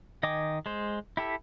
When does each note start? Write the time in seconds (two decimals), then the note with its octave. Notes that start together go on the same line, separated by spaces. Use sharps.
0.23 D#3 D#5 G5 G#5 D6
0.66 G#3 C5
1.17 E4 G4 A4